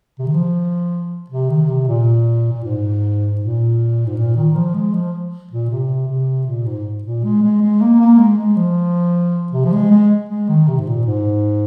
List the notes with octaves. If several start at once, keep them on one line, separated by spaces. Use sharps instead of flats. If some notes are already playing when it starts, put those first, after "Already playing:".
C3
D#3
F3
C3
D#3
C3
A#2
A#2
G#2
A#2
G#2
A#2
D#3
F3
G#3
F3
A#2
C3
C3
A#2
G#2
A#2
G#3
G#3
G#3
A#3
A#3
G#3
G#3
F3
C3
F3
G#3
G#3
G#3
D#3
C3
G#2
A#2
G#2